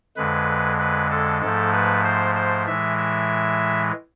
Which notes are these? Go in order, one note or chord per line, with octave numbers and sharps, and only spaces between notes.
F2 D3 G#3 B4
B4
A4
G#2 F3 A3 A4
B4
C5
C5
A2 E3 G#3 E5
E5